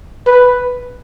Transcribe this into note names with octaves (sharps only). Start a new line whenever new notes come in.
B4